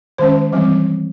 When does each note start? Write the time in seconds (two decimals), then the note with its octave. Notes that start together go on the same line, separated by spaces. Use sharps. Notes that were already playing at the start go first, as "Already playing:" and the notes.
0.18 D#3 G#3 C#4 C5
0.53 E3 G3 C4